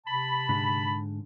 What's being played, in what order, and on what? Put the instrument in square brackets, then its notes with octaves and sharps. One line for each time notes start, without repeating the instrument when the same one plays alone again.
[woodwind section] C3 A5 B5
[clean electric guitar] G#2 D3